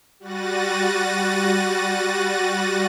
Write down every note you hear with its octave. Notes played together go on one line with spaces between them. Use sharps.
G3 F#4 F#6 A6 A#6 D#7